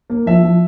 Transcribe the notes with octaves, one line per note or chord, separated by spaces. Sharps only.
A#3
F3 E5
F3